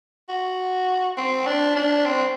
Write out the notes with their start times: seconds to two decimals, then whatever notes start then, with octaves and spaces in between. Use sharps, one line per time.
0.29 F#4
1.17 C4
1.47 D4
1.76 D4
2.05 C4